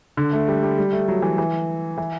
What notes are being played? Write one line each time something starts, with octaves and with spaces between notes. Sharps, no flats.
D3
A3
G3
G3
G3
A3
F#3
E3
E3
E3